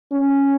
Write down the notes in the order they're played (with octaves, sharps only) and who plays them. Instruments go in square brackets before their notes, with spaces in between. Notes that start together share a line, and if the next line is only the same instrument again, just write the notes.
[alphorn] C#4